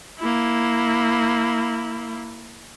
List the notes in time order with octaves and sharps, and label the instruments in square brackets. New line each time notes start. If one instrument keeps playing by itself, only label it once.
[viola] A#3 E4